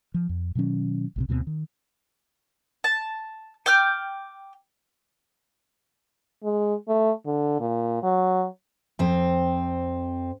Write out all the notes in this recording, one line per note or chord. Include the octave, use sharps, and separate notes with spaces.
F3
F2
B2 D#3 F#3 C#4
A#1 G#2 C3
D2 B2 D#3 C4
D#3
A5
G5 D6 F6 G6
G#3
A3
D3
A#2
F#3
F2 C4